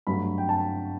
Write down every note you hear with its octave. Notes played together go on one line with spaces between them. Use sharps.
G2 F#3 A3 B5
G5
A5